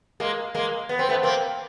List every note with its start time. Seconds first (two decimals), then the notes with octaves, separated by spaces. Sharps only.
0.20 G#3 A#3
0.55 G#3 A#3
0.89 B3
0.99 C4
1.09 A3 B3
1.23 A#3 C4